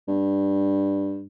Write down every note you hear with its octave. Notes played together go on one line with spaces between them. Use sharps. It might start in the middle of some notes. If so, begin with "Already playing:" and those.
G2